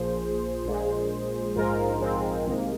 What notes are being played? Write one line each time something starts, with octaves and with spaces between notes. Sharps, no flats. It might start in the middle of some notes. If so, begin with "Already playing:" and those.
Already playing: A#1 A#2 F3 G#4 C5
A#1 A#2 G#3
A#1 G#2 F3 G#3 F4 A#4
G#3 C4
C2 C3 D#3 G#3 A#3